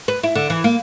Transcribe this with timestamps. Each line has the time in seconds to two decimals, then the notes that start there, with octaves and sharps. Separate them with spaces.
0.08 B4
0.23 E4
0.35 D3
0.50 E3
0.64 A#3